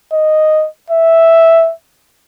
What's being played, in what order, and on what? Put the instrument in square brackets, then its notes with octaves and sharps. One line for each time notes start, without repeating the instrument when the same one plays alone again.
[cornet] D#5
E5